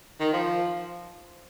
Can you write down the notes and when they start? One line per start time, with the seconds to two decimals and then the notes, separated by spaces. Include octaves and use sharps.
0.20 D#3
0.33 F3